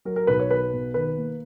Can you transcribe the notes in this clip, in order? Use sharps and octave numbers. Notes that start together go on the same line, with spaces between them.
F#3 A#4
A#4
B1 B4
C#5
B1 B4
B2
D#3 B4
A#3